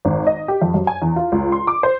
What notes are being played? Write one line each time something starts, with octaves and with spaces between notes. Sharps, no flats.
G#1
D#5
G4
F2
F#2
G#5
E2
F4
C#2
C6
D6
C5